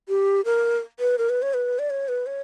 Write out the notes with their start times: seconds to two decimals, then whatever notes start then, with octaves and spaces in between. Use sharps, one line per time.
0.09 G4
0.45 A#4
1.00 B4
1.18 A#4
1.29 B4
1.42 C#5
1.54 B4
1.79 D5
1.90 C#5
2.08 B4
2.26 C#5